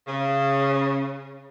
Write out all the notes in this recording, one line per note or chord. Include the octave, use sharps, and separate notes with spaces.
C#3